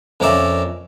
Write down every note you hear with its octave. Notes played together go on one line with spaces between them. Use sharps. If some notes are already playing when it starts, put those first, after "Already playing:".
F2 A#2 C#4 A#4 D5 E5